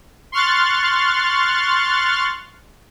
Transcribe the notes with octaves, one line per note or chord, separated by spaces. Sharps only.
C6 C#6 F6 F#6 A6